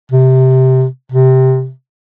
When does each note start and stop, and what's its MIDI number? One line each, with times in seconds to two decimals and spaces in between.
0.11 0.85 48
1.12 1.70 48